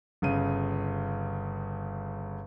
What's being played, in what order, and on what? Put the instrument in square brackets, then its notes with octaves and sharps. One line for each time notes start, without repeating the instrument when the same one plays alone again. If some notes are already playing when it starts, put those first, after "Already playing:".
[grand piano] G1 C#3 D#7